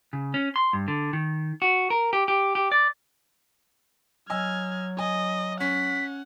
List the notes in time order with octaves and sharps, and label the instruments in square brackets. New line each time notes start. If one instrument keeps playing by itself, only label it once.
[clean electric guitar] C#3
C#4
C6
G2
D3
D#3
F#4
A#4
G4
G4
G4
D5
[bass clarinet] F#3 [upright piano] D#5 G#5 E6 [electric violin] F6 G#6
[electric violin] D#5 [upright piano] G#5
[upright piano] C#4 [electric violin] F#5 [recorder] B6